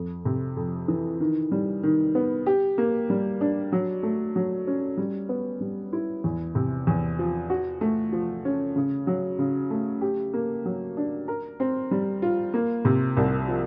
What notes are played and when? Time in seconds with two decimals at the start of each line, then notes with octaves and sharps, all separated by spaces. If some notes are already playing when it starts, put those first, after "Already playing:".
Already playing: F2
0.25 C3
0.57 F2
0.88 E3
1.20 D#3
1.52 G3
1.83 D#3
2.15 B3
2.46 G4
2.78 A#3
3.10 G3
3.41 D4
3.72 F#3
4.03 A3
4.36 F#3
4.67 C#4
4.98 G3
5.29 B3
5.61 G3
5.93 E4
6.24 E2
6.55 C3
6.87 E2
7.19 F3
7.50 F#4
7.81 A3
8.12 F3
8.45 C#4
8.76 C#3
9.07 F#3
9.39 C#3
9.70 A3
10.01 G4
10.33 A#3
10.65 F#3
10.97 D4
11.28 A#4
11.60 C4
11.91 G3
12.22 F4
12.54 A#3
12.85 C3
13.17 C2
13.48 F3